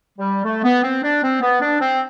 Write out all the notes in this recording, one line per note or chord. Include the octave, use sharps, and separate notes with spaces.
G3
A3
B3
C4
D4
C4
B3
D4
C4